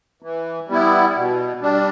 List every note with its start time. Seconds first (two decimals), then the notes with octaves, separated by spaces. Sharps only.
0.22 E3
0.68 G3 B3 E4
1.15 B2
1.62 G3 D4